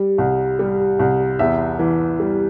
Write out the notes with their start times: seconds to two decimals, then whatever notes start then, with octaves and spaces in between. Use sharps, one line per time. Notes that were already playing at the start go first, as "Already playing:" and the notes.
Already playing: G3
0.18 C2
0.59 G3
0.99 C2
1.39 E2 E5
1.79 E3
2.20 G3